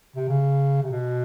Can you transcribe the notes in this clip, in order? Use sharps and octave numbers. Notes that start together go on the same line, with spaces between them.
C3
C#3
C3
B2